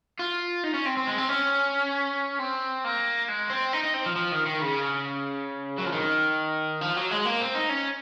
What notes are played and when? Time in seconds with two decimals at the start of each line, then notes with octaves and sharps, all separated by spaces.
0.19 F4
0.63 D#4
0.74 C#4
0.85 C4
0.97 C4
1.07 G#3
1.18 C4
1.29 C#4
2.39 C4
2.84 A#3
3.28 G#3
3.50 C4
3.73 D#4
3.83 D#4
3.94 C4
4.06 F3
4.16 F3
4.32 D#3
4.46 D#3
4.61 C#3
5.78 F#3
5.86 F3
5.92 D#3
6.81 F3
6.96 F#3
7.11 G#3
7.25 A#3
7.41 C4
7.55 D#4
7.70 C#4